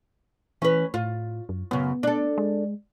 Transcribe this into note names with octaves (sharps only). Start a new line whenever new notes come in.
E3 C#4 B4
A2 F4
F#2
F#2 C#3 B3
D4 A4
G#3